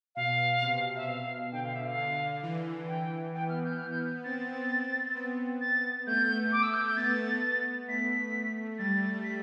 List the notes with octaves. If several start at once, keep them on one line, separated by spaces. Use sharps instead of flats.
B2 F5
C3
E5
B2 F5
D3 G5
F5
E5
F5
D3
E3
G5
B3 G5
F6
G6
F6
G6
C4 A6
B3
A6
A3 G6
D6
E6
G6
G6
B3 A6
B3
A3 B6
G3 A6
B6